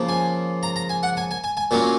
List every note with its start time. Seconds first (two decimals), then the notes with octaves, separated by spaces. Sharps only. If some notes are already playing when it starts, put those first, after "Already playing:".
Already playing: C#3 F3 A#3
0.09 G#5
0.63 A#5
0.76 A#5
0.89 G#5
1.03 F#5
1.17 G#5
1.31 G#5
1.44 G#5
1.57 G#5
1.71 A#2 F#3 C#4 G#5